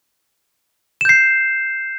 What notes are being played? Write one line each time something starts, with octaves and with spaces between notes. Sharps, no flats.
G6 C7 E7